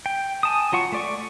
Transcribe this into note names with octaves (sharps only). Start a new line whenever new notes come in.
G5
G#5 A5 D#6
F#3 F4 F#5 C#6
A3 D5 C#6